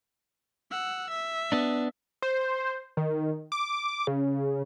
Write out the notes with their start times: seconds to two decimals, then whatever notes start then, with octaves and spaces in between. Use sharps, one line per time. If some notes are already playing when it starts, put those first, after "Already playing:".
0.71 F#5 E6
1.10 E5
1.52 B3 D4
2.22 C5
2.97 D#3
3.52 D6
4.07 C#3